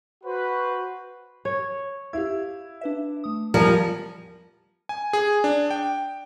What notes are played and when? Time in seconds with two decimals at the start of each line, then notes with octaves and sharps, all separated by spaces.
0.24 F#4 B4 C5
1.45 C#5
2.13 E4 G4 F5 G#6
2.81 D4 B4 E5
3.24 A3 D#6
3.54 E2 F3 G3 A#4 A5 G#6 C#7 D#7
4.89 G#5
5.13 G#4
5.44 D4
5.71 G5